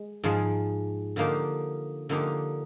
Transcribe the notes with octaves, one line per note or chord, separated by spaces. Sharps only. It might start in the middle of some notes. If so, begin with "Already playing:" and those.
Already playing: G#3
G#2 F3 G#3
D3 F3 A#3 D#4 G4
D3 F3 A#3 D#4 G4